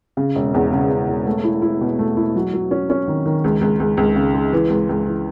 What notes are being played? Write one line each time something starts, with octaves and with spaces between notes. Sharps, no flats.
C#3
E1
E2
C#3
C#3
E1
A3
E4
E4
B2
A3
E4
F#3
F#3
C#4
C#4
D#3
D#3
C#2
C#2
C#2
C#2
C#3
G#3
E3
C#2
C#2
E3